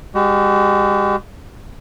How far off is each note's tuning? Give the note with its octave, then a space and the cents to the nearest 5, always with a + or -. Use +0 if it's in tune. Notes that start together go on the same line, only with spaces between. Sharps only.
G#3 -40 F#4 +45